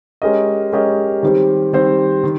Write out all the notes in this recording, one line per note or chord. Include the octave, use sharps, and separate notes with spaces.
G#3 C#4 G4 A#4 D#5
G#3 C#4 G4 A#4 D#5
D#3 G3 C4 G4 C5
D#3 G3 C4 G4 C5
D#3